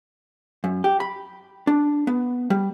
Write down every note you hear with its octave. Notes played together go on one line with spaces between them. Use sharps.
F#2
G4
B5
D4
B3
G3